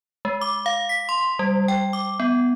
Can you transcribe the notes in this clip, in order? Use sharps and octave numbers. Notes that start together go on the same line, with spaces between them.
G#3
D6
F5
B6
C6
G3
G5
D6
B3